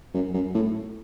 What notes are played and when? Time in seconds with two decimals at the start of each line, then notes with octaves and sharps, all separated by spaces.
0.14 F#2
0.34 F#2
0.55 A2